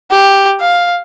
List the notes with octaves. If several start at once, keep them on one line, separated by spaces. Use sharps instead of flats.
G4
F5